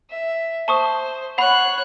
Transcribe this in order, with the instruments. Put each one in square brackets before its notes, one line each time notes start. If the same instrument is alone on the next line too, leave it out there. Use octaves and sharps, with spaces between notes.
[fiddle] E5
[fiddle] C5 [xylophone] A5 C#6 D#6
[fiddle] C#5 F#6 [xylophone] F#5 B5